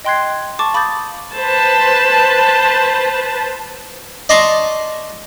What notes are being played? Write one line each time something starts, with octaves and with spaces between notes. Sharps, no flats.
D#5 G5 C6 F#6 G#6 C7
A5 C#6 D6 A6
F5 B5 D6 D#6 G6 A6
B4 C5 A5
D5 D#5 A5 A#5 C6 C#6